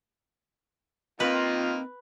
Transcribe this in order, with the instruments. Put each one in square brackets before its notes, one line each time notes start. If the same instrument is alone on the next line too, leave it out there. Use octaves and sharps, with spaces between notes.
[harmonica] D#3 A#3 D#4 [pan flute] C4 [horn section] F4 [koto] B4